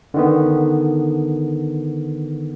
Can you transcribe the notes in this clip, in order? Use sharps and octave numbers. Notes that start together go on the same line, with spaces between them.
D3 D#3 B3